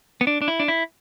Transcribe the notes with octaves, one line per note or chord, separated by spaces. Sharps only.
B3
D4
D4
E4
D4
E4